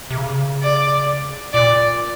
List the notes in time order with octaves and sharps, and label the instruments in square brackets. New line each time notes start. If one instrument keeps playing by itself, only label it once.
[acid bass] C3
C#3
[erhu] D5
[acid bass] A#2 [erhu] D5